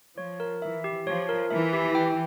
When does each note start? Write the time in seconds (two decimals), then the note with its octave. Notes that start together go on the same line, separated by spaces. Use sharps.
0.17 F3 C#5
0.40 A#4
0.62 E3 E5
0.84 G4
1.06 F3 C#5
1.29 A#4
1.50 E3 E5
1.73 G4
1.95 G5